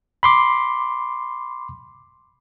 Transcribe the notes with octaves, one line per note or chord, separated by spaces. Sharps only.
B5 C6 D6